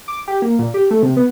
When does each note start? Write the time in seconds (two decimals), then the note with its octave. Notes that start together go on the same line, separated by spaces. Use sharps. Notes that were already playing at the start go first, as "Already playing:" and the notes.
0.08 D6
0.28 G4
0.42 A#3
0.59 A#2
0.74 G4
0.91 A3
1.03 C3
1.17 B3